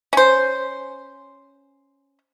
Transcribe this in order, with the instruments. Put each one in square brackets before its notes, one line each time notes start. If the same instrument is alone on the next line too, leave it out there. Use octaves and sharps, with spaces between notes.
[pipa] C#4 C5